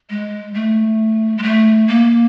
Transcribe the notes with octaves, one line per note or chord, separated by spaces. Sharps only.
G#3
A3
G#3
A3
A#3